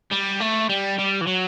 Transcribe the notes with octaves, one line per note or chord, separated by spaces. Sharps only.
G3
A3
G3
G3
E3
F#3